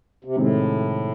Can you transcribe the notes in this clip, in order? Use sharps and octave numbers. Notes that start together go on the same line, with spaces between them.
C3
A2 C3 D#3 G#3 C4